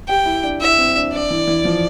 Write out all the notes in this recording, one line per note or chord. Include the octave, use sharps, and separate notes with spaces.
G4 G5
E4
D4
E4 E5
C4
D4
D4 D5
E3
E3
F3